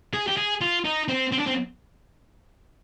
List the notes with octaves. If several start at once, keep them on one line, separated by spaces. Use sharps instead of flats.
G#4
G4
G#4
F4
D#4
C4
C4
D4
C4